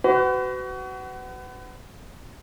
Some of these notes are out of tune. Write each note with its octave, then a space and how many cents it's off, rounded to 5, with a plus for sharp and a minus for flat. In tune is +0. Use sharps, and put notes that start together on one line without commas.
F#4 +25 B4 +35